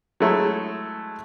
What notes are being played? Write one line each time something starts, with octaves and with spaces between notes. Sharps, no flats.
F#3 G#3 A3 E4